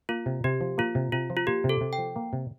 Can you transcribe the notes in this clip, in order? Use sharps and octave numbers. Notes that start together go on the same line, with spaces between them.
A#3 F4
C3
C3 G4
F3
A#3 F4
C3
C3 F4
F3
F4
A#3 G4
C3
A4
C3
G5
F3
A#3
C3